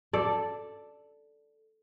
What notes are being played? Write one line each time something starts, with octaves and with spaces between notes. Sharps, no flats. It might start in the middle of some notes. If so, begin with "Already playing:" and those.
A4 D5